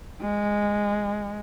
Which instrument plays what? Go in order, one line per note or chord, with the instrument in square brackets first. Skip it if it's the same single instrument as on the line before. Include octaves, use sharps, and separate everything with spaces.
[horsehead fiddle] G#3